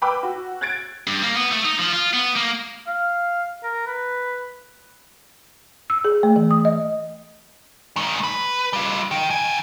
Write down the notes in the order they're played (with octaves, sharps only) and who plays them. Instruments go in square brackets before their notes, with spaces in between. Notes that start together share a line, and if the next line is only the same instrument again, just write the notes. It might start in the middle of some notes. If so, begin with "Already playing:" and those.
[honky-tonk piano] B4 G5 B5 D6 E6
F#4
F#6 G#6 A6 D7
[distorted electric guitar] G2
A#3
B3
A3
D#4
F3
F4
B3
A#3
[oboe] F5
A#4
B4
[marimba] E6
G#4
A3
E3
D#6
D#5
[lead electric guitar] G#2 D#3
B4
G3 F4
D#3
D#3 G#5